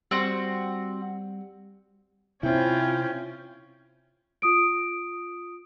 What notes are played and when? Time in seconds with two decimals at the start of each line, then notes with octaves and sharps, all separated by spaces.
0.11 G3 C4 F#4
2.43 C3 C4 C#4 E4 F4 G5
4.42 F4 D#6 D7